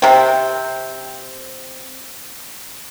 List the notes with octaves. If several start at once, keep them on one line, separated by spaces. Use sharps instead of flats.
C3 C4